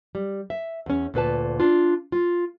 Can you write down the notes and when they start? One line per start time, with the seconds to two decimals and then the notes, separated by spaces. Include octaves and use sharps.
0.15 G3
0.50 E5
0.86 E2 C#4
1.14 D2 A#2 B4 A5
1.60 D4 F4
2.12 F4